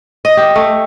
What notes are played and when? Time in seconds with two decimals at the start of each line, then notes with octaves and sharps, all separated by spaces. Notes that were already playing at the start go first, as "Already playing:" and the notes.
0.25 D#5
0.37 G4
0.56 A3